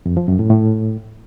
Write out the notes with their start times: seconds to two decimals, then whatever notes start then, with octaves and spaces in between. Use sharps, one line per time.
0.06 F2
0.17 F3
0.28 F#2
0.39 A2
0.50 A2